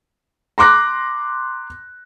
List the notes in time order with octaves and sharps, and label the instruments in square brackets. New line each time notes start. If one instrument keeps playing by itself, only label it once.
[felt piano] A#5 C6 D6 F#6 A#6